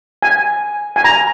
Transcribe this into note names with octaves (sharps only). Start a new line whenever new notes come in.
G#5
G#5
A#5